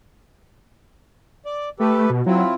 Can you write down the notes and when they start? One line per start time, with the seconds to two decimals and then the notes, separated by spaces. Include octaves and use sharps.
1.46 D5
1.80 A3 G4 A4 B4
2.10 B2
2.26 F#3 C4 E4 F4